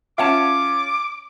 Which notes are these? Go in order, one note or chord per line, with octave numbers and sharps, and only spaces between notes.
C#4 F4 E5 F#5 A5 D6